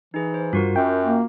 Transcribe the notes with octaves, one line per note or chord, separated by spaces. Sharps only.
E3 D#4 G#4
C5
G2 F4 F#4 A#4
F#2 G5
A#3